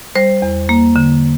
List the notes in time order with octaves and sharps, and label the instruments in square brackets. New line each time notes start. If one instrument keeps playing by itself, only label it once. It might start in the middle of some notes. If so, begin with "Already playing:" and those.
[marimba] G3 C5
E2
A#3
D3